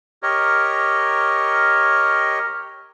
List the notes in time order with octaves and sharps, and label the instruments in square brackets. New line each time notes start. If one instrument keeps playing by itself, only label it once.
[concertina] G4 A#4 C#5 D#5